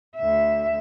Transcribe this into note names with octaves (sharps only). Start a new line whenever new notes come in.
D2 E5